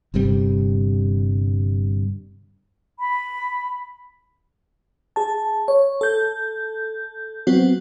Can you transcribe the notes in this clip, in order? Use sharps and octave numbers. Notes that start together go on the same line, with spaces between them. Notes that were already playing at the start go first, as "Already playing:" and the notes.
G1 G2 C3 G3
B5
G#4 A5
C#5
A4 G6
F#3 B3 C4 F#4